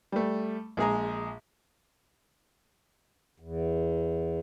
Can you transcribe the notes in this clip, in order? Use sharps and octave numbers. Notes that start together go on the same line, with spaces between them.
G3 A3
A#1 G#3 G#4 A#5
E2